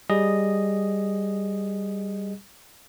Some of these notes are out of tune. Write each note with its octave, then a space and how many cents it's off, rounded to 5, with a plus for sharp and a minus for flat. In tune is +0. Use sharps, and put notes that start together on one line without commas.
G3 +0 G#4 +0 D#5 -5